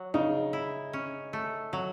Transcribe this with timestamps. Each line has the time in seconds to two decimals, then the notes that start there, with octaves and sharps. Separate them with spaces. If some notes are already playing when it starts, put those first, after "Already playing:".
Already playing: F#3
0.14 C#3 D#4
0.53 E4
0.93 C#4
1.33 A3
1.73 F#3